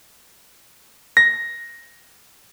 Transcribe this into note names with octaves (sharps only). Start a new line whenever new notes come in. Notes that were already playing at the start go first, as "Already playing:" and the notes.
A#6